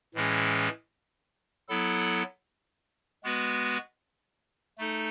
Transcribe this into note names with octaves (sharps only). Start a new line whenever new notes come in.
A2 E3 G#3 C#4 G#4
F#3 B3 E4 A4
G#3 B3 F#4 B4
A3 D#4 A4